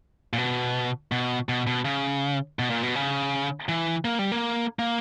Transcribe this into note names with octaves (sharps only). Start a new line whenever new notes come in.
A#2
B2
B2
B2
B2
C#3
B2
A#2
B2
C#3
E3
A#3
G3
A#3
A#3